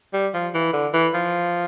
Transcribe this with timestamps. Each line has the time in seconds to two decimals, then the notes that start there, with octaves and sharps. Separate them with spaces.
0.14 G3
0.34 F3
0.54 E3
0.73 D3
0.93 E3
1.14 F3